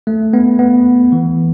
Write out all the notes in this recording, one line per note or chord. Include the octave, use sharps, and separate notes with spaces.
A3
B3
B3
E3